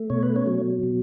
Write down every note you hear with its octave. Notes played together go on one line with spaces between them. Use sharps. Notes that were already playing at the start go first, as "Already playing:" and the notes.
Already playing: A3
B2 C#5
B4
C#4 C#5
F#3
B2